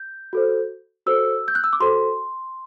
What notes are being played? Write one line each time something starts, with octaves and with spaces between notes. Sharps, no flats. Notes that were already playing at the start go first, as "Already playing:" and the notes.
Already playing: G6
F#4 A4 C5
F#4 A4 C5 E6
G6
F#6
E6
D6
F#4 A4 C5 C6